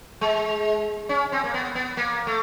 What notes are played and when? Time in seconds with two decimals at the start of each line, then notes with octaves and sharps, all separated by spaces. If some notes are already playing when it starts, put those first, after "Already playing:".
0.21 G#3
1.09 C#4
1.32 C4
1.44 A#3
1.54 B3
1.75 B3
1.97 A#3
2.27 A3